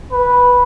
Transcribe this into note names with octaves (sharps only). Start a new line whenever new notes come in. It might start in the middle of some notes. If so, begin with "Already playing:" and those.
B4